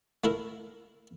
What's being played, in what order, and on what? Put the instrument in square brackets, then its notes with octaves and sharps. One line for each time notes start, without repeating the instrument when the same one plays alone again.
[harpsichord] A3 E4 A#4